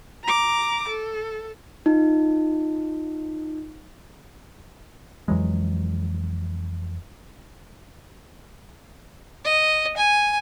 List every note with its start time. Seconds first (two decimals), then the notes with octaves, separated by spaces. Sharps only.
0.24 A#5 D6
0.88 A4
1.86 D#4 F4
5.28 F2 E3 F#3 G#3
9.45 D#5
9.97 G#5